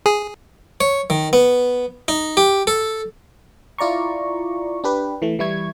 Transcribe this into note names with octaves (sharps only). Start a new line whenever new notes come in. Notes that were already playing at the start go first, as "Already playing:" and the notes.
G#4
C#5
D#3
B3
D#4
G4
A4
E4 F4 D5 A#5 C#6
D4 G4 B4
E3 A3
E3 G3 E4 C#6 G#6